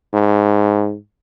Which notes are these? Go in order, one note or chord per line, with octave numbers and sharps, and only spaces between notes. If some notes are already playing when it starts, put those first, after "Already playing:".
G#2